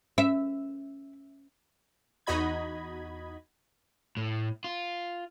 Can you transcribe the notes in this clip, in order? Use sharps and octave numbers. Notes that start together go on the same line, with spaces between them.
C#4 E5
E2 D#4 F#4 D#5 B5 G#6
A2
F4